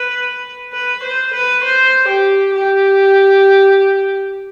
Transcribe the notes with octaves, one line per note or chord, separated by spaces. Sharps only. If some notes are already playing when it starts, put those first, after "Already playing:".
Already playing: B4
B4
C5
B4
C5
G4
G4